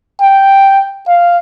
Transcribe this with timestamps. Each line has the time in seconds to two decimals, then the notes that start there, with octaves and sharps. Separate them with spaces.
0.22 G5
1.08 F5